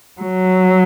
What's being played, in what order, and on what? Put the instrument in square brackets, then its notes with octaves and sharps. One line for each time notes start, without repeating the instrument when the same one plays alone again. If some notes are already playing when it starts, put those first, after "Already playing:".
[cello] F#3